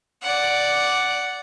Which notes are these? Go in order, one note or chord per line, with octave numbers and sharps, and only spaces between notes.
D5 F#5